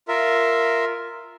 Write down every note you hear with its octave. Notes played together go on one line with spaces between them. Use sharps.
F4 A#4 E5